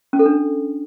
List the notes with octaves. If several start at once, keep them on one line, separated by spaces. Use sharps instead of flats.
C#4
A4
D4